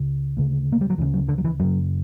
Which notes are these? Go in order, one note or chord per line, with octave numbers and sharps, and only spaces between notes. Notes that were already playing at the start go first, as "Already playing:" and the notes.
Already playing: C#2 C#3
D2 C#3
A#3
G3
F#3
D2 C#3 E3
F#3
D3
F#3
E3
F#2 C#3 F#3